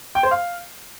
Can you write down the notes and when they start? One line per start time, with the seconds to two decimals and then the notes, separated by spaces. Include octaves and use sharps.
0.15 G5
0.23 C5
0.31 F5